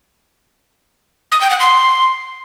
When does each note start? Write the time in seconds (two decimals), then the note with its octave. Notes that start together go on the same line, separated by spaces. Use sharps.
1.32 D#6
1.41 G5
1.50 F#5
1.60 C6